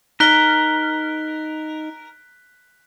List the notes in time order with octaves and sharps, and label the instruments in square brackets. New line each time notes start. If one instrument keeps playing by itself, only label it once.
[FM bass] D#4 [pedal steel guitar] A#4 [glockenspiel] F#6 B6 G7